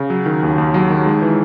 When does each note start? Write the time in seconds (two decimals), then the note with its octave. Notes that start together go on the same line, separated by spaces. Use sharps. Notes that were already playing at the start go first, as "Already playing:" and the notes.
Already playing: C#3
0.10 F#3
0.26 D#3
0.43 D#2
0.58 D#2
0.74 F#3
0.90 D#3
1.06 G#3
1.22 E3